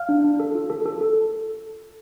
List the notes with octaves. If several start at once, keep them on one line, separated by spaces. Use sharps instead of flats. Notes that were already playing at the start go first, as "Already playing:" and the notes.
Already playing: F5 F6
D4
D4
A4
F4
A4
A4
A4